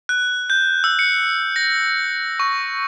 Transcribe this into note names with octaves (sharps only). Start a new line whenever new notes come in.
F#6
G6
E6
C#7
A#6
C#6